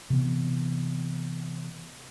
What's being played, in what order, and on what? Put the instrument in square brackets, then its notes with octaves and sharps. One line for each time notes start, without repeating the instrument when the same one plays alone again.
[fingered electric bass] C3 E3 B3